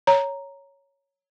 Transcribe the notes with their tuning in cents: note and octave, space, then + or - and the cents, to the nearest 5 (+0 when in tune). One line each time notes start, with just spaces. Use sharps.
C#5 +0 A#5 +0